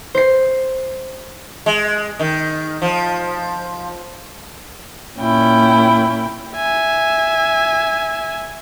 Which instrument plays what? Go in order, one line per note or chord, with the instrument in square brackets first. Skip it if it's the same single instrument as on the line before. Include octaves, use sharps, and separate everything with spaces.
[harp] C5 C7
[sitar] G#3
D#3
F3
[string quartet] A#2 C#4 E4 G5
[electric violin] E5 G#5